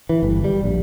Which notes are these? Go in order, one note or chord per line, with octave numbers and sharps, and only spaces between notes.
E3
G1
G3
A#1